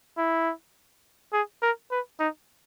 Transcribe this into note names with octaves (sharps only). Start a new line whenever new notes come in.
E4
G#4
A#4
B4
D#4